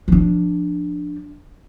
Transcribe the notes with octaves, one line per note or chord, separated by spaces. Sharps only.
F3 D4